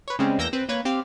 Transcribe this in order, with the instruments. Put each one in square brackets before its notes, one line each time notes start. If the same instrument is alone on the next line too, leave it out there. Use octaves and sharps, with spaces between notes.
[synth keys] B4 C#5
C#3 G3 G#3 C4 C#4
E2 A#3 E6 G6 A#6
C4 B4
A#3 B4 C#5
C4 G4 F5